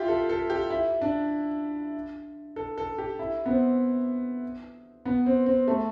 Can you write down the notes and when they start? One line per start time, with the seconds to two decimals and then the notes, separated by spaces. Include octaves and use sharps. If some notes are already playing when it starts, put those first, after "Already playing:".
Already playing: E4 F4 G4
0.08 A4
0.29 A4
0.50 G4
0.70 E4
1.01 D4
2.56 A4
2.78 A4
2.98 G4
3.19 E4
3.46 B3
3.50 C4
5.05 B3
5.26 C4
5.46 C4
5.68 A3